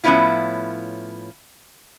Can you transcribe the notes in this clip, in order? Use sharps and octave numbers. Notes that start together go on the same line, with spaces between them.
A2 F3 B3 C#4 E4 F4